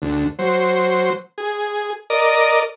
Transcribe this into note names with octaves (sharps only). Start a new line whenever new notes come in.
D2
F#3 C5
G#4
A#4 D5 D#5